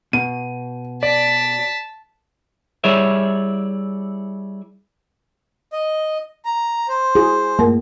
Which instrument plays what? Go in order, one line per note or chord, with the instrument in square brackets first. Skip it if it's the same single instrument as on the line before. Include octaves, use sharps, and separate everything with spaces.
[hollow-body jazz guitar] B2 [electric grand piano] D#7
[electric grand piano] D5 [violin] A5 B6
[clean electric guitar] G3 E4 G#4 C#5 D5 E5
[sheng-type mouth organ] D#5
A#5
C5
[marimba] E4 F#4 [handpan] G#4
[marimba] G2 A3 A#4 [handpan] A#3